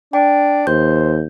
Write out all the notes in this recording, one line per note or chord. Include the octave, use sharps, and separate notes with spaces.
D4 G5
D#2 C5 G6